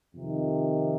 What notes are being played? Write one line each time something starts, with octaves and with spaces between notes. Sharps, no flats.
F2 C3 D#3